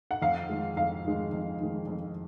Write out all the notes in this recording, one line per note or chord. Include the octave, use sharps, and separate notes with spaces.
F#5
F2 F5
D#3 G#3
F2 F5
D#3 G#3
F2
D#3 G#3
F2